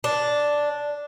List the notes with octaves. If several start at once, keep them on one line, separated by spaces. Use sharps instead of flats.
D4